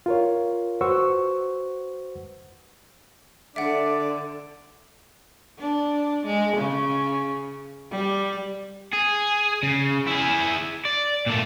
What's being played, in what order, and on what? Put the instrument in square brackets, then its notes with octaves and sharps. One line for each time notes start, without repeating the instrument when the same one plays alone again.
[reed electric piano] F4 A#4 C#5
F#4 B4 C5 F#5 C#6 E6
[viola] D3 [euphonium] D4 [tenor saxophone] D5 [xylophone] E5 F#5
[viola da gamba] D4
G#3
C#3
G3
[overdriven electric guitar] G#4
C#3
E4 G#4
D5
A#2 A3